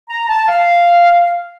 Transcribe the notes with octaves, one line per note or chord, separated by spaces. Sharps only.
A#5
A5
F5